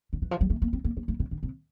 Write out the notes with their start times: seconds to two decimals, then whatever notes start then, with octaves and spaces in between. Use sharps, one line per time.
0.13 D3
0.22 E3
0.31 F3
0.41 G3
0.50 A3
0.62 A#3
0.73 C4
0.84 A#3
0.97 A#3
1.08 A3
1.20 C3
1.31 D3
1.43 C3